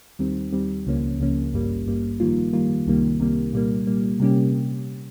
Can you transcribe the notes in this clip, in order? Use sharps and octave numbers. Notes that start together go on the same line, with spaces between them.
D#2 D#3 G3 C4
D#2 D#3 G3 C4
C#2 C#3 F3 A#3 C#4
C#2 C#3 F3 A#3 C#4
G#1 G2 G3 A#3
G#1 G2 G3 A#3
F2 D#3 G3 A#3 F4
F2 D#3 G3 A#3 F4
C2 C3 D#3 G3 A#3
C2 C3 D#3 G3 A#3
A#2 G3 A#3
A#2 G3 A#3
C3 G3 A#3 C#4 G4